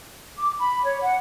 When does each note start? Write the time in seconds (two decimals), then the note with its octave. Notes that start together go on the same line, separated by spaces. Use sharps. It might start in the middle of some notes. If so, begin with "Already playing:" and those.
0.37 D6
0.58 B5
0.84 C#5
1.01 F#5